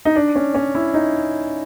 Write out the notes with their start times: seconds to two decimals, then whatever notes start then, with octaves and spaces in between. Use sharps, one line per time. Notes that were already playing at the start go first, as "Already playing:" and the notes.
0.05 D#4
0.16 D4
0.35 C#4
0.54 C#4
0.75 E4
0.94 D#4